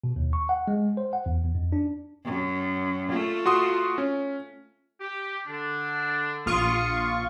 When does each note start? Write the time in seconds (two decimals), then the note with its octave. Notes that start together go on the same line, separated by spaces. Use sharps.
0.04 B2
0.16 D#2
0.33 C#6
0.49 F#5
0.68 G#3
0.97 C5
1.13 F#5
1.26 E2
1.44 E2
1.55 F2
1.72 D4
2.25 F#2
3.08 A3 F4
3.46 F#4 C6 D#6
3.98 C#4
5.00 G4
5.47 D3 D4
6.46 A#1 F4 F5 C6 C#6 D#6